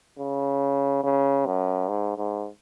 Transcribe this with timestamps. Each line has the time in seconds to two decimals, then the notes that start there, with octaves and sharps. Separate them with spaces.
0.18 C#3
1.04 C#3
1.46 F#2
1.89 G#2
2.17 G#2